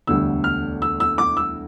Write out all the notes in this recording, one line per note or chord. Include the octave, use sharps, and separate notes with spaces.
E1 D2 D3 G3 E6
F6
E6
E6
D6
E6